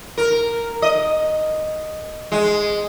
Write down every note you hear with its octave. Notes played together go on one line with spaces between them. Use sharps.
A#4
D#5
G#3